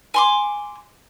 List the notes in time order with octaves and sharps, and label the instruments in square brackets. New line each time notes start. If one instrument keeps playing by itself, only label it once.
[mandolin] G#5 C6 D6